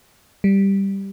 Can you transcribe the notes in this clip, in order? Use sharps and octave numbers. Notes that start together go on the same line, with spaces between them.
G3